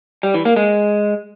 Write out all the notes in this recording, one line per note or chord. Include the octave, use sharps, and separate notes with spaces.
G3
E3
A#3
G#3